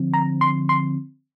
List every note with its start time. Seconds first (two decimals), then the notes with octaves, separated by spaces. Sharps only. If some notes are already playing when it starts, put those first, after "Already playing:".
Already playing: D3 F3 C4
0.14 A#5
0.41 C6
0.69 C6